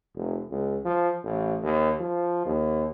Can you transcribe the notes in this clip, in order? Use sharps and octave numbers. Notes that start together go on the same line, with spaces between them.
F1
C#2
F3
A1
D#2
F3
D#2